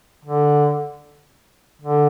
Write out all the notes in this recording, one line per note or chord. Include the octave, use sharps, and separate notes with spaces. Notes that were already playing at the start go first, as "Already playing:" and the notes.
D3
D3